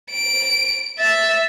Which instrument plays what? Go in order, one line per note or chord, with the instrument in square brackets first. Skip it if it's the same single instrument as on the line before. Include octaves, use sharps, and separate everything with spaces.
[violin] D7
E5 A6